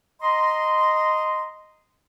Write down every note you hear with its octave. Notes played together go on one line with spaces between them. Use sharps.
D#5 A#5 C6